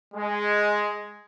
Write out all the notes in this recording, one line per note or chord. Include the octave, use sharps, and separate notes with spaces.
G#3